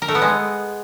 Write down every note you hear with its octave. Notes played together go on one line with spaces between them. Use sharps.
A#4
A3
B3
G#3